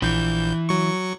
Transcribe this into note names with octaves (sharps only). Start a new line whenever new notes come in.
A#1 E3 G6
F#3 C#6